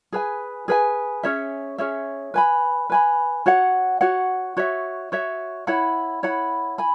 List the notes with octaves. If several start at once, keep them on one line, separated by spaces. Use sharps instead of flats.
G#4 B4 G#5
G#4 B4 G#5
C#4 G#4 C#5 E5
C#4 G#4 C#5 E5
B4 G#5 B5
B4 G#5 B5
F#4 C#5 F#5
F#4 C#5 F#5
F#4 C#5 E5
F#4 C#5 E5
E4 C#5 F#5 B5
E4 C#5 F#5 B5
G#5 B5